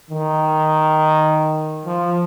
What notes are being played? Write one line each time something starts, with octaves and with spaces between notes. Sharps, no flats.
D#3
F3